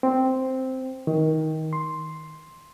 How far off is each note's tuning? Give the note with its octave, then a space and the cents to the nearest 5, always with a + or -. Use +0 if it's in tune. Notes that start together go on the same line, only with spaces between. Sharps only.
C4 -5
D#3 +20
C6 +5